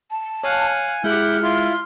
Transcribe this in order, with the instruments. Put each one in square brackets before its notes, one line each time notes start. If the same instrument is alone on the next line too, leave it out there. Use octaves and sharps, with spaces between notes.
[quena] A5
[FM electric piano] C#5 [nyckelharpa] F5 F#5 [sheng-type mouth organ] G#5
[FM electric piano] G#3 G#4 [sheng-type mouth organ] E4 G6 [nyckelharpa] G4 F#5 [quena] F6
[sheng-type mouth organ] E4 F4 [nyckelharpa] C6